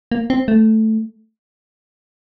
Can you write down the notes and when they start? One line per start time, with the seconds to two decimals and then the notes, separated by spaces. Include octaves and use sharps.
0.12 A#3
0.30 C4
0.48 A3